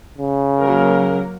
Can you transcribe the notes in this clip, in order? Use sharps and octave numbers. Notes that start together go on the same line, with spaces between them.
C#3
F#3 A#3 A#4